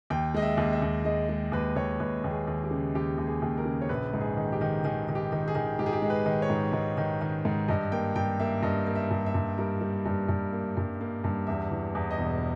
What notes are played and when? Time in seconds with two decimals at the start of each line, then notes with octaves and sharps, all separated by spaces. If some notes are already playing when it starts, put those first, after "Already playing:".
0.10 D#2 G5
0.34 G#3 D#5
0.42 E5
0.57 D#2
0.73 E5
0.82 D#2
1.05 G#3 D#5
1.29 G#3
1.52 D#2 B4
1.76 D#2 C#5
2.00 D#2 B4
2.24 D#2
2.31 G#4
2.47 D#2
2.64 G4
2.71 C#3
2.95 D#2 G4
3.18 D#2
3.27 G#4
3.42 D#2
3.57 A#4
3.65 C#3
3.82 C#5
3.89 A#1 B4
4.13 G#2
4.21 G#4
4.37 D#3
4.52 G4
4.61 D#3
4.84 D#3 G#4
5.08 D#3
5.15 G4
5.32 D#3
5.48 G#4
5.55 D#3
5.79 G#2 G4
5.86 G#4
5.93 G4
6.02 G#3
6.10 B4
6.26 D#3
6.42 C#5
6.50 G#2
6.73 G#2
6.97 D#3
7.21 D#3
7.45 G#2
7.68 G2 D#5
7.92 A#3 G5
8.16 G2 G5
8.39 A#3 E5
8.63 G2 D#5
8.87 A#3
8.95 E5
9.11 G2
9.26 E5
9.34 G2
9.58 G3 A#4
9.81 G3
10.06 G2
10.29 G2
10.53 A#3
10.77 G2
11.01 A#3
11.24 G2
11.47 E2 E5
11.71 E3
11.95 E2
12.11 D#5
12.18 E1